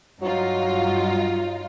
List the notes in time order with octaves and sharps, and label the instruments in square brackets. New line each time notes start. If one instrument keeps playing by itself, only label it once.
[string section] G2 D#4 F4 [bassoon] F#3